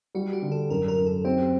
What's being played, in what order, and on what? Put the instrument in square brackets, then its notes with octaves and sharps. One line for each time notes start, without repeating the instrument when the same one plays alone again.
[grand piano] G3 [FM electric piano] F#4
[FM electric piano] G4
[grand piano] D3
[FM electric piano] A4
[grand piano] F#2 [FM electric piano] A#4
[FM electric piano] A#4
[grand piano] F#2
[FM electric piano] A4
[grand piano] C4 [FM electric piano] G4